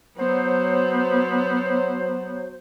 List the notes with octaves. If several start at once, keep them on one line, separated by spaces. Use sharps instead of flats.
F#3 B3 C5